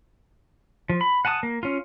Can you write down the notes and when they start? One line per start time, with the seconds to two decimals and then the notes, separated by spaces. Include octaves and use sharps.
0.89 F3
1.01 B5
1.25 F#5 G#5 A5 D6 D#6
1.43 A#3
1.63 C#4 F4